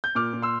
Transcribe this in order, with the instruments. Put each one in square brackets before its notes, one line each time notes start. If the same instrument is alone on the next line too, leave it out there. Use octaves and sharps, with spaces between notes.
[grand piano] G6
A#2 D6 F6
A#2
C6 E6